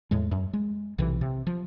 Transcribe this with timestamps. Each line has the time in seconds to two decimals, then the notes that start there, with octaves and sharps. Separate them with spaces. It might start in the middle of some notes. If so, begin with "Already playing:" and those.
0.11 E2 A2 G#3
0.31 F#2
0.53 G#3
0.98 B1 C3 E3
1.21 C3
1.47 F3